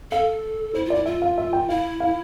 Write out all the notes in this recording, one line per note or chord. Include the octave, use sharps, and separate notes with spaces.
A4 F5
E4 C5
F4 D5
E4
F4 E5
F5
E5
G5
E4 F5
F5